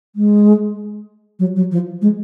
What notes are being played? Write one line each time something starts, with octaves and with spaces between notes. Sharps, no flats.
G#3
F#3
F#3
F3
G#3